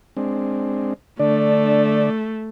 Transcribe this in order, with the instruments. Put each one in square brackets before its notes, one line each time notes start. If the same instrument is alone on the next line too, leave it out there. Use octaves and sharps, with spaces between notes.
[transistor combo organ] G#3 C4 D4
[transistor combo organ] D3 D5 [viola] A3 [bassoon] D4